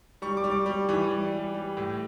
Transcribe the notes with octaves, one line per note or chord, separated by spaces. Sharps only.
G3 C#6
D6
G3
D6
G3
E3
G3
G3
G3
A2